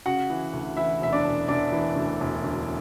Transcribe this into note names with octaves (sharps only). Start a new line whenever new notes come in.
C#3 F#4 F#5
E3
D2
E3 E4 E5
E1 E5
D4 D5
E1
E1 D4 D5
E3
D2
E1
D2